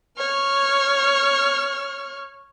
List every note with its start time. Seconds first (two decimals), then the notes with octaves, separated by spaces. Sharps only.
0.18 C#5 F6